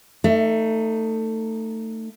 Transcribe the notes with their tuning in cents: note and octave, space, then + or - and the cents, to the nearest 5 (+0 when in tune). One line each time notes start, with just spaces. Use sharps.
A3 +20 D#4 +0